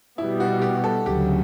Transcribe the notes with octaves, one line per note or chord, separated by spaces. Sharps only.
B2 G3 B3 E4
F#4
G4
A4
D2 C#3 F#3 G4